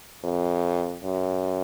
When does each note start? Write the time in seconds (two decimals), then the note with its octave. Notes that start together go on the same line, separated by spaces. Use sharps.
0.24 F2
1.04 F#2